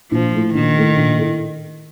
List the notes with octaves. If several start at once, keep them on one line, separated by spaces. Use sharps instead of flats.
A#1 F3
A2 A3
A#1 D#3
A2 A3
A#1
A2 A3